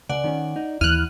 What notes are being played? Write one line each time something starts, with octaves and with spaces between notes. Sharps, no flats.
C#2 D5 F#5
D#3 C#4
D#4
D#2 E3 E4 F6 F#6 D#7